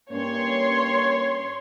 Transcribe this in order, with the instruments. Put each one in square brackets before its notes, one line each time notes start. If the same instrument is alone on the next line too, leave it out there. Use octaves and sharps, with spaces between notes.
[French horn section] G2 A#3 C#4 [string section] C#5 C6